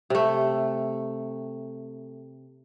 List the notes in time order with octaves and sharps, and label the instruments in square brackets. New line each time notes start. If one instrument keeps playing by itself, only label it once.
[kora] C3 A3